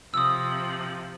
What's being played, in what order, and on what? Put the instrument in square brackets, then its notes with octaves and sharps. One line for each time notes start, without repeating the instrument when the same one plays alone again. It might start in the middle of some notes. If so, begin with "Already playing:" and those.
[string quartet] C3 F3 [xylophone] D#6 E6